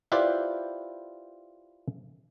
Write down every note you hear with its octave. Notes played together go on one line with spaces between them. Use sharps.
E4 F4 G4 B4 C5 D5